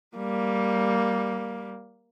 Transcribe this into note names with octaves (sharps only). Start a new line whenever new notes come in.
G3 A#3